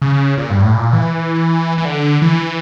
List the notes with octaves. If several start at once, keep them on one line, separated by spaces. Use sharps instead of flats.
C#3
A#2
G2
A2
A#2
E3
E3
D3
E3